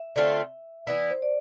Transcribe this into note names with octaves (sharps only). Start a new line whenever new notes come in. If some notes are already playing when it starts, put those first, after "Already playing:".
Already playing: E5
D3 A3 C4 F4
E3 B3 E4 D5
C5
D5